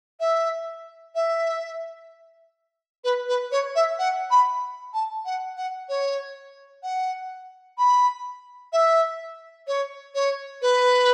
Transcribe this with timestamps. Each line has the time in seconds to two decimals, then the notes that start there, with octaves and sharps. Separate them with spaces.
0.19 E5
1.14 E5
3.03 B4
3.28 B4
3.51 C#5
3.75 E5
3.98 F#5
4.30 B5
4.93 A5
5.25 F#5
5.56 F#5
5.88 C#5
6.82 F#5
7.77 B5
8.72 E5
9.67 C#5
10.14 C#5
10.61 B4